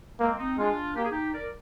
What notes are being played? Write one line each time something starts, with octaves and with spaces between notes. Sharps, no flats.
G#3 A#3 C4
C4 D#4
G#3 D4 F4
A#3 G4
G#4
D#4 G4
A#4 D5